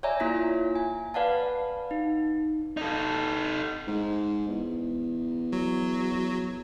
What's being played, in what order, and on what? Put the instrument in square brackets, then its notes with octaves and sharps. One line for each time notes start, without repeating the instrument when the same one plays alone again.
[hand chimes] C#5 D5 E5 G#5 A#5
A#3 E4 F4 A#5 B6
G#5
B4 D5 F5 F#5 A5
D#4
[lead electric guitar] D#4 A4
[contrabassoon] G#2
E2
[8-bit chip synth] F#3